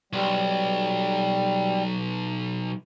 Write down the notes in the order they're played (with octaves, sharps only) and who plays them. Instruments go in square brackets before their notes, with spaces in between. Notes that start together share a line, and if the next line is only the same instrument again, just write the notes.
[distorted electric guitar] B1 [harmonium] G3